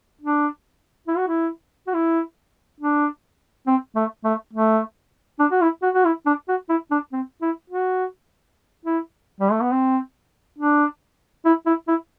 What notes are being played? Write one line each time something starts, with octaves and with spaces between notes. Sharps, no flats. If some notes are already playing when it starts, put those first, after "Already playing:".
D4
E4
F#4
E4
F#4
E4
D4
C4
A3
A3
A3
D4
F#4
E4
F#4
F#4
E4
D4
F#4
E4
D4
C4
E4
F#4
E4
G3
A3
B3
C4
D4
E4
E4
E4